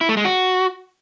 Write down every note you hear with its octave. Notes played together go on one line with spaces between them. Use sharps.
E4
A3
G#3
F#4